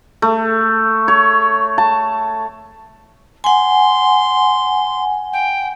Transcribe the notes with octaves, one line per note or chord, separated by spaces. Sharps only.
A3
C#5
A5
F#5 G#5 C6
G5